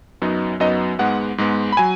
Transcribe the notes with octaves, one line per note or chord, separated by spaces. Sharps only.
F#2 F#3 B3 D#4
F#2 F#3 B3 D#4 D#5
G#2 G#3 B3 F#5
G#2 G#3 B3
B5
F#3 G#5